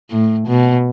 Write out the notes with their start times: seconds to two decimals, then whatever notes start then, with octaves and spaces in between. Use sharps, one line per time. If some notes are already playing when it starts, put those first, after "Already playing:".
0.11 A2
0.48 B2